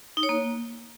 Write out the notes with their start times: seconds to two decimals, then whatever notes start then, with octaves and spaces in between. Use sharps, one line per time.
0.17 D#4
0.23 C#5
0.29 A#3